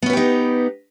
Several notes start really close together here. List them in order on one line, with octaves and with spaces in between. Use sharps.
B3 C#4 B4 G4 D#4